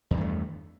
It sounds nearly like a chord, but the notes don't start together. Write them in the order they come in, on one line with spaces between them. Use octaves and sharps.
E2 D#3 G2 A3